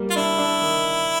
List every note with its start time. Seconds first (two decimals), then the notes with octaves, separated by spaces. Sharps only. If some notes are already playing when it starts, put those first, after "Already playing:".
Already playing: G3 A#3
0.10 F4
0.16 D4 E4
0.38 D4
0.62 D#3